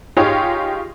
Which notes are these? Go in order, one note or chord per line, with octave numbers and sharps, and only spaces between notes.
D#4 F4 G4 G#4 C#5